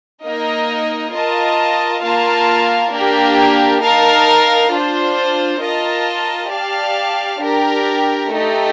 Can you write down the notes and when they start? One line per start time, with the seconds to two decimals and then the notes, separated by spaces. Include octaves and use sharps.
0.22 A#3 D#4 A#4 D#5
1.12 F4 A#4 D#5 A5
2.02 A#3 F4 A#4 F5 A5
2.91 A#3 D4 G4 A#4
3.81 D#4 A#4 F5 A5
4.71 D4 F4 C5
5.61 F4 A#4 D#5 A5
6.51 G4 D5 F5 A5
7.41 D4 G4 A#4
8.30 A3 D#4 G4